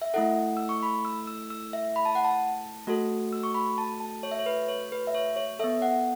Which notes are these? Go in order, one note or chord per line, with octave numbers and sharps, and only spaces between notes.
E5
A3 E4 A4 F#5
E6
C#6
B5
E6
E6
E6
E5
B5
A5
F#5
A5
A3 F#4 A4
E6
C#6
B5
A5
A5
C#5
E5
C#5
B4
C#5
B4
E5
C#5
C#5
B3 A4 E5
F#5